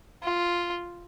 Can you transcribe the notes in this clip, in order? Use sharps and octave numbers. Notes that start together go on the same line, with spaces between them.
F4